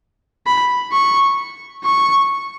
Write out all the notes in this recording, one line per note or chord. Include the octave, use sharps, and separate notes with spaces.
B5
C#6
C#6